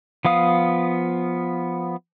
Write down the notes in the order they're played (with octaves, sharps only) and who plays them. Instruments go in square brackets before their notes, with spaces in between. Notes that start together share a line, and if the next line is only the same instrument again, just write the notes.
[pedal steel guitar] F3 B3 F5 D#6